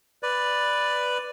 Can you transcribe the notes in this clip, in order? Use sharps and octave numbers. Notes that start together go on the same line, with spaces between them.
B4 D5